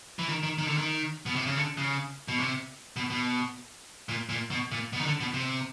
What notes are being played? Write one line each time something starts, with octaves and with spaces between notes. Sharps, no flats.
E3
D#3
D#3
D#3
D3
D#3
B2
C3
C#3
D3
C#3
B2
C3
B2
B2
A#2
A#2
B2
A#2
B2
D#3
D3
B2
C3